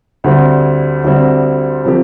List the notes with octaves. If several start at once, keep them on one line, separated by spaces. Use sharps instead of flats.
D2 D3 G3 C4
D2 D3 G3 C4
C3 F3 C4 G4